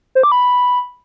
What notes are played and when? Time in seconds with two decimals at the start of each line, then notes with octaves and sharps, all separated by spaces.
0.15 C5
0.23 D6
0.32 B5